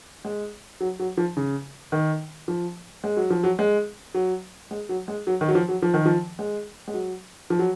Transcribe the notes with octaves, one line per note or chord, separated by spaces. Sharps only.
G#3
F#3
F#3
F3
C#3
D#3
F3
G#3
F#3
F3
F#3
G#3
F#3
G#3
F#3
G#3
F#3
D#3
F#3
F3
F#3
F3
D#3
F3
G#3
G#3
F#3
F3
F#3